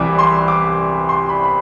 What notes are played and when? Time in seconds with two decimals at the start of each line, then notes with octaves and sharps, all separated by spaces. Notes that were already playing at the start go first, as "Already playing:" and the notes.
Already playing: C2 C3 E3 G3 B5 D6
0.19 C6
0.48 D6
1.09 C6
1.29 B5
1.44 B5